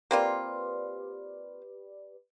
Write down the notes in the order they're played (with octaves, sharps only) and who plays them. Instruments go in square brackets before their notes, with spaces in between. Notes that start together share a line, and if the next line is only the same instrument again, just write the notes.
[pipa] A#3 C4 F4 [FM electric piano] G4 B4 D5